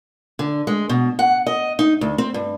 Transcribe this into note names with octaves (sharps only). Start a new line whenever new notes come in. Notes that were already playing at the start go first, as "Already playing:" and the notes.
D3
G#3
B2
F#5
D#5
D#4
D2
C4
G2